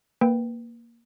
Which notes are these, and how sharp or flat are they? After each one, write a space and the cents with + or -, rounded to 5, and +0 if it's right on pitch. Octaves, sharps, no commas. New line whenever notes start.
A#3 +0 B4 +0 G5 +0